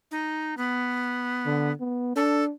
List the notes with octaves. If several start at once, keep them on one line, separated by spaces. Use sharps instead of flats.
D#4
B3
D3
B3
D4 A4